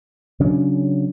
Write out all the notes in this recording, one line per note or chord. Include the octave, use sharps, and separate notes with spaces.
C#3 F#3 C#4 D4